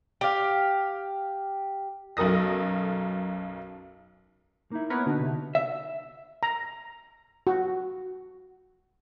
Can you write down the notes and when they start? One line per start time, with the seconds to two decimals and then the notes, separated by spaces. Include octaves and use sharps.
0.21 G4 F5
2.17 B1 F#2 A4 A#4 D#6 A#6
4.72 A#3 D#4 E4
4.90 B3 A#4 B4 C#5
5.06 B2 D3 D4 D#4
5.20 C3
5.55 E5
6.43 A#5
7.47 F#4